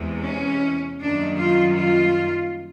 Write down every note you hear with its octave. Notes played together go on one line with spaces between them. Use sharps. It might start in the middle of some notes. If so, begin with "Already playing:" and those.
Already playing: E2 C3 E3 G#3
C#4
F#2 D#3 G3 A#3 D4
F4
F4